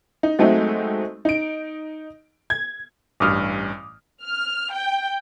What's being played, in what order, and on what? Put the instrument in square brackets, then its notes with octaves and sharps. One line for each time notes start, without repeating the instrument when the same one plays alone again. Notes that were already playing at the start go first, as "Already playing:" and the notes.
[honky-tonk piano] D#4
F#3 G#3 A3 C4 D#4
D#4 D7
G#6
[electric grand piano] A1 G2 [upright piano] D6 D#6 F6
[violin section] F6
G5